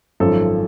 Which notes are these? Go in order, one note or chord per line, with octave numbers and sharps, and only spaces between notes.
G#1 F#2 F3 A4